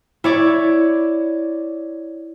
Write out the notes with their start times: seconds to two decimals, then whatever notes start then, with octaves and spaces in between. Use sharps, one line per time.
0.24 E4 C#5 D5